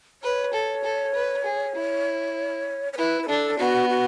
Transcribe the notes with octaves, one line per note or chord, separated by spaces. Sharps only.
B4 C#5
A4
A4
B4
G#4
E4
C#5
E4 B4
B4
D4 A4
B3 F#4
F#4